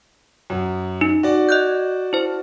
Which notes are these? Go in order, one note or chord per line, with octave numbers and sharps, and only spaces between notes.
F#2 F#3
D#4
F#4 D5
D#5 F#6 G6
E4 C5